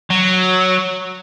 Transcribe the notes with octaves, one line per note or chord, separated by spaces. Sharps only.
F#3